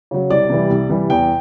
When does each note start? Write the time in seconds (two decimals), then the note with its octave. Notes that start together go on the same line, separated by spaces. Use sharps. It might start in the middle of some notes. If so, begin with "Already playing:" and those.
0.11 C#3 F#3
0.30 C2 D5
0.50 C3 E3 G3
0.70 C2
0.89 C3 E3 G3
1.10 E2 G5